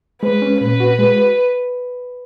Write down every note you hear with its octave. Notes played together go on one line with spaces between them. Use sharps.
G#3 B4
C#4
A#2 B4
F#4
G#3